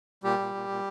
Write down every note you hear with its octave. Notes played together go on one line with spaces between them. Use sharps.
A#2 G3 G4
A#2
A#2
A#2